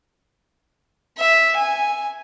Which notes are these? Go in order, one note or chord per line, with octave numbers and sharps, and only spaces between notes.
E5
G#5